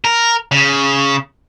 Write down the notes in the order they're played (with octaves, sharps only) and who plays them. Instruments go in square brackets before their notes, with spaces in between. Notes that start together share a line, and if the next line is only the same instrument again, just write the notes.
[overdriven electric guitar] A#4
C#3